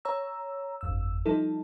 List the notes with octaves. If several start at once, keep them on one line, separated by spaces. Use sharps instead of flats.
C#5 A#5 E6
G1 F2 E6
F3 G3 D#4 E4 A4